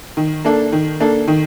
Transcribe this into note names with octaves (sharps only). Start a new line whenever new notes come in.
D#3
A#3 D4 A4
D#3
A#3 D4 A4
D#3